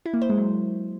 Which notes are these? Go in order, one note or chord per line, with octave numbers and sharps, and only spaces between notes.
E4
A#3
C5
G#3
F#3